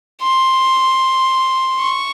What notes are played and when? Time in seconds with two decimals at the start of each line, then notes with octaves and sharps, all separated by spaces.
0.22 C6
1.79 C#6